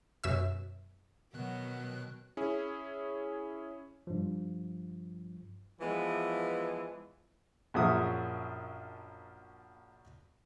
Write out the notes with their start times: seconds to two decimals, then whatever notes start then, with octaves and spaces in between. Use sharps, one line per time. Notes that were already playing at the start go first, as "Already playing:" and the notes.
0.24 F#2 B2 E5 E6
1.34 B2 D#3 F#3 B3 F#6
2.37 C#4 E4 G#4
4.07 G2 F3
5.80 E3 F3 G#3 B3 E4
7.74 A#1 F#2 F3 F#3 E5 D#6